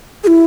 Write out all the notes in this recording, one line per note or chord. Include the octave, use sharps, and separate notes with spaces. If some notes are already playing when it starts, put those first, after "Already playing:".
G#4
E4